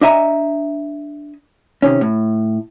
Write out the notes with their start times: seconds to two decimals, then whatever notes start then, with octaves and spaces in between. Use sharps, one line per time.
0.01 D4 D#5 E5 G#5 A#5
1.82 C3 D#3 C#4
2.01 A2